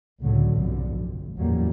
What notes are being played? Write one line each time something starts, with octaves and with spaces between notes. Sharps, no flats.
C#2 A2 D3 F#3
F1 B1 G2 B2 D3
F1
F#1 E2 A2 F#3 G3 A#3